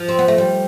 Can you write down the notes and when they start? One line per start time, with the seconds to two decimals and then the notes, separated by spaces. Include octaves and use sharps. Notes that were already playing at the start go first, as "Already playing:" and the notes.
Already playing: F3
0.09 C4
0.19 B3
0.28 A3
0.38 G3